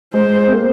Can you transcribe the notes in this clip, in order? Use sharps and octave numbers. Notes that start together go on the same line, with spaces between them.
G#3 C5
C4
A#3